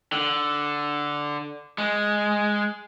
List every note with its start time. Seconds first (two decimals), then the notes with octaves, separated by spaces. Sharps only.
0.12 D3
1.78 G#3